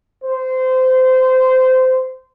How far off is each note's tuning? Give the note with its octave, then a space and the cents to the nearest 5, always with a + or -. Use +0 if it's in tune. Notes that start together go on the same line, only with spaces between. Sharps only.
C5 -20